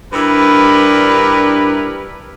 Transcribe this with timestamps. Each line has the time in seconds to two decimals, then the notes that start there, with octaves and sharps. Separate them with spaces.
0.14 G2 D4 E4 G4 A#4 B4